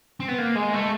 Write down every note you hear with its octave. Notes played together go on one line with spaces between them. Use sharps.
C4
B3
A#3
G#3
A3